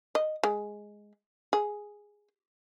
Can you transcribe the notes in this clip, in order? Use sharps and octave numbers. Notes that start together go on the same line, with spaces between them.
D#5
G#3
G#4